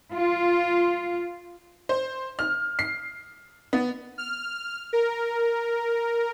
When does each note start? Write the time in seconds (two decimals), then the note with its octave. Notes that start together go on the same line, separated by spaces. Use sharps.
0.13 F4
1.89 C5
2.39 F6
2.79 C7
3.73 B3
4.18 F6
4.93 A#4